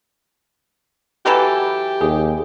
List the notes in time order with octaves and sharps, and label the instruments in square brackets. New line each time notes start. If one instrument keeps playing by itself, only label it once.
[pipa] E3 F#3 A4 [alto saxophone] G4
[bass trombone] D#2 [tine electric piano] G#4